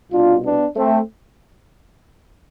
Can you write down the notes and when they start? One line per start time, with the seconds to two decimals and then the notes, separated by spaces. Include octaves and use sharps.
0.12 C2 B2 D4 F4
0.44 B3 D4
0.76 A3 C4